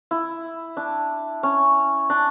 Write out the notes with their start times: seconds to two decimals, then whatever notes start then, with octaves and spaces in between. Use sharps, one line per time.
0.11 E4
0.77 D4
1.43 C#4
2.10 D4